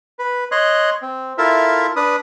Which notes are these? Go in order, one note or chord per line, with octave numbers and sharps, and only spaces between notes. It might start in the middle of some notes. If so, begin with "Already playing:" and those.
B4
C#5 D#5 C6 F#6
C4
E4 F4 A4 A#4 E5
D4 B4 D#6